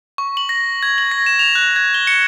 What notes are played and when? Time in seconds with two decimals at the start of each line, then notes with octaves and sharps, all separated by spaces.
0.18 C#6
0.37 F#7
0.49 A#6
0.83 G#6
0.98 F#7
1.11 A#6
1.26 E7
1.39 F7
1.55 F#6
1.76 G#6
1.94 G7
2.07 C#7